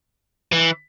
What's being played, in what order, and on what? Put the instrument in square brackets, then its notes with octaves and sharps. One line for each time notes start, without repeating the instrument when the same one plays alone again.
[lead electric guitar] E3